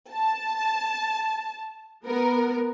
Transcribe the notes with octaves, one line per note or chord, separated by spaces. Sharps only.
A5
B3 A#4